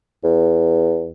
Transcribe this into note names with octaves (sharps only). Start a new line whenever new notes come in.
E2